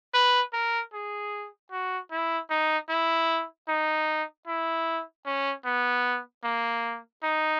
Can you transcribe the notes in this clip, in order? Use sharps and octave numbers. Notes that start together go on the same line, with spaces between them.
B4
A#4
G#4
F#4
E4
D#4
E4
D#4
E4
C#4
B3
A#3
D#4